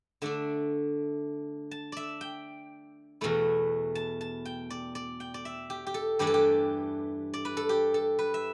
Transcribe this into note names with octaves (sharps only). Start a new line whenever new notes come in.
D3 A3 D4 E5
A5
D5 E5
G5
E2 B2 A3 E4
A5
A5
G5
D5
D5
G5
D5
E5
G4
G4
A4
G2 E3 A3 D4 G4
A4
G4
D5
B4
A4
G4
A4
B4
E5